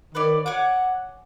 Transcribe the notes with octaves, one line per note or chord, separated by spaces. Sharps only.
D#3 B4 C#5 D5
C#5 F#5 G#5 D6